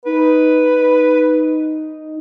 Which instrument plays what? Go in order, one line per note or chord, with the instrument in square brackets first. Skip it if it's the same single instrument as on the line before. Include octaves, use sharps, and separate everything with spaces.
[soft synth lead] D#4 [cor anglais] B4